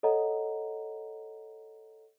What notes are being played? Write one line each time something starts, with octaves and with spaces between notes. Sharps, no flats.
A4 C#5 D#5 F#5 A#5